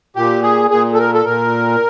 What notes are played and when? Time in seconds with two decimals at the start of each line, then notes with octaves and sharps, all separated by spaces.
0.16 A#2 G4
0.43 G#4
0.70 A#2 G#4
0.94 A4
0.99 A#4
1.14 A4
1.25 A#2 A#4